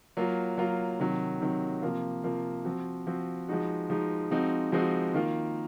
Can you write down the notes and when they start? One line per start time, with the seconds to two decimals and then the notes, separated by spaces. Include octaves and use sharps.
0.17 F#3 A#3 F4
0.57 F#3 A#3 F4
1.00 C3 D#3 F#3
1.41 C3 D#3 F#3
1.82 C3 F3 A#3 F4
2.24 C3 F3 A#3 F4
2.65 F3 C4 F#4
3.07 F3 C4 F#4
3.49 F3 G#3 D#4 F#4
3.90 F3 G#3 D#4 F#4
4.31 F3 G#3 C4 D#4 F#4
4.72 F3 G#3 C4 D#4 F#4
5.14 D#3 A#3 F4